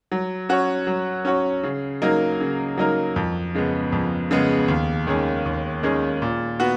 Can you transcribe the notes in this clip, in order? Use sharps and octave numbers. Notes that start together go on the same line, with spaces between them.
F#3
C#4 F#4 C#5
F#3
C#4 F#4 C#5
C#3
F#3 A#3 D#4 A#4
C#3
F#3 A#3 D#4 A#4
F2
C#3 G#3 B3
F2
C#3 G#3 B3
D#2
D#3 G#3 C#4 G#4
D#2
D#3 G#3 C#4 G#4
A#2
B3 F#4